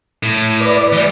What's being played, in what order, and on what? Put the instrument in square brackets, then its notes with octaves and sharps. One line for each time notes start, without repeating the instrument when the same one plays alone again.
[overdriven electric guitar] A2
[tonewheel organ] B4 D5
[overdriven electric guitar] E3 G3